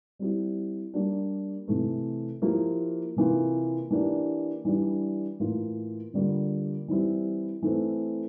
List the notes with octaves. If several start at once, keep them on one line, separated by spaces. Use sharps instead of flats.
G3 C4 E4 G4
G3 A#3 D4 G4
C3 E3 A3
F3 A#3 E4 G4
C3 E3 A#3 F4
E3 A#3 D4 G4
E3 G3 D4
A2 E3 A#3 F4
D3 G3 A#3 F4
E3 G3 C4 E4 G4
E3 A3 C4